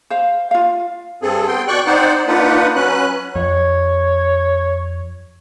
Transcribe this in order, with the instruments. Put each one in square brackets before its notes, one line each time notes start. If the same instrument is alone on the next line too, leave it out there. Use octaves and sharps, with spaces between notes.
[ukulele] C5 F5
F4 F5
[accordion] G2 C4 G#4 A4
B3 G5 C6
B2 D5 G5 C#6 F#6
C4 D#4 C5 D5 F#5
A#3 D4 D#4 F4 B4 F#5
F#3 C#4 B4 F#6
[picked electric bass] F2 [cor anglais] C#5